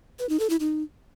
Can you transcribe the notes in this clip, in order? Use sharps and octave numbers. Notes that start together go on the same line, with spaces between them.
B4
D#4
A4
E4
D#4